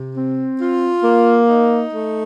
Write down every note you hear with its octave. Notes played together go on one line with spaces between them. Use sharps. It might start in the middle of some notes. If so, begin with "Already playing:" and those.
Already playing: C3
C4
F4
A#3
D#4
A3